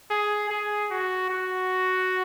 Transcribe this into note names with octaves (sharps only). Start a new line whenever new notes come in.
G#4
G#4
F#4
F#4